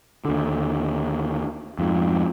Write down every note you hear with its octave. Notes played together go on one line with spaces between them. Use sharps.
D#2 D3
F2 G#2